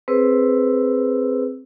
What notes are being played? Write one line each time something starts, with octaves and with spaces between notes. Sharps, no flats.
C4 G#4 B4 C5 E6